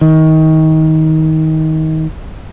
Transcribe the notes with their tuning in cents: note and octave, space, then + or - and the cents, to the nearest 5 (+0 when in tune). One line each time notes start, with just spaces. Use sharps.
D#3 +25